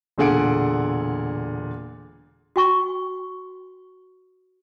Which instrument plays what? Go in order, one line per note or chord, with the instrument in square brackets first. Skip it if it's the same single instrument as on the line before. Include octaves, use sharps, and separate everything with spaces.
[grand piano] E1 A#2 D3 G#4 F#5 D7
[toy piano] F#4 G5 C#6